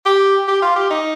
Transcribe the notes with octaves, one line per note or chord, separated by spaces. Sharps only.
G4
G4
F4
G4
D#4